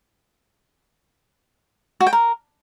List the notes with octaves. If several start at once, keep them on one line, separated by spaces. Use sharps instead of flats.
F#4
G5
A#4